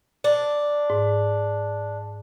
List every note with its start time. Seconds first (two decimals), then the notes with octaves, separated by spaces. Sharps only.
0.24 D4
0.90 G#2